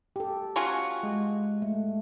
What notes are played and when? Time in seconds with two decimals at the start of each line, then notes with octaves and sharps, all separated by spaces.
0.16 G4 A4
0.56 C#4 F4 F#4
1.03 G#3
1.62 A3